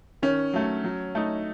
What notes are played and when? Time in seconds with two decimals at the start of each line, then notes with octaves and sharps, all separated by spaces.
0.22 D#3 C#4
0.53 F#3 A3
0.84 F#3
1.15 A3 D#4